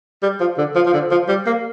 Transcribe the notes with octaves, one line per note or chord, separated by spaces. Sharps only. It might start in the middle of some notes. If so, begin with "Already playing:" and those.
G3
F3
D3
F3
F3
D3
F3
G3
A#3